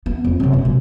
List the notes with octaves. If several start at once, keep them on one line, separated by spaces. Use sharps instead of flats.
B3
F2
F#2 C3
B2
A3